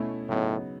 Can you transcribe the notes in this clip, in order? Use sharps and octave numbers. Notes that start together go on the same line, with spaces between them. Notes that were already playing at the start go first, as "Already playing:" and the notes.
Already playing: B2 A3 C#4 E4
A2 C#3 F#3 B3 D#4